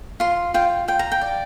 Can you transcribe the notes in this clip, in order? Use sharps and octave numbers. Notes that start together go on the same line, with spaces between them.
F4 C6
F4 G5
F4 G5
A#5
G5
D5